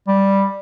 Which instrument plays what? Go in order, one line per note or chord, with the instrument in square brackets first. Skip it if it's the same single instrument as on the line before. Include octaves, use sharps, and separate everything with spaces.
[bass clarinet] G3